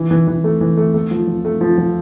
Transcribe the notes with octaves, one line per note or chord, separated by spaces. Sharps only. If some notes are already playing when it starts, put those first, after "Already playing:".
Already playing: E3
E3
E3
A3
E3
A3
A3
F3
F3
A3
F3
F3